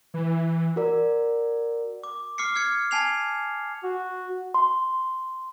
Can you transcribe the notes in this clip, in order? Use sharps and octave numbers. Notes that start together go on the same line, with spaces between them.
E3
F#4 A#4 D5
D6
D6 F6 C7 C#7
F6 G#6 C#7
G#5 A5 G#6 C7 C#7 F7
F#4
C6